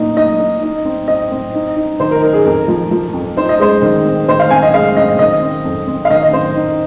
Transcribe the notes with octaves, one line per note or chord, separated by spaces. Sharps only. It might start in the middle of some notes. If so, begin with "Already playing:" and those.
Already playing: A#2 D#4
D#4 D#5
D#4
D#4
C4
C4 D#5
C4
D#4
D#4
D#3 C5
A#4
D#4 A#4
G#4
F2 A#4
F3
F3
F2
D#4 C5
D#5
G#3 C5
D#3
C4
D#3 C5
F5
C4 G#5
D#5
G#3 F5
C4 D#5
D#3 D#5
C4
F2
C4
F5
D#3 D#5
D#5
C4 C5
D#4